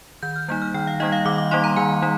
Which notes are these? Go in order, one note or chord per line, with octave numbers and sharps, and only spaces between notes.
D#3 G6
F6
G3 A#3 D#4 G6
F6
D#3 G5
F5
G3 A#3 D#4 D#5
F5
D#3 D6
D6
G3 A#3 D#4 C6
A#5
D#3 G#5
G3 D#4